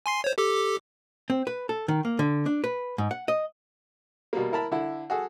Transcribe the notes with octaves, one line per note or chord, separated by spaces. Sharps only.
G#5 C6 C7
C5 C#5
G4 A4 D6
C4
B4
A4
D#3
A#3
D3
D4
B4
G#2
F#5
D#5
B2 G3 A#3
E4 A#4 A5 B5
D3 E4
F#4 G#4 A4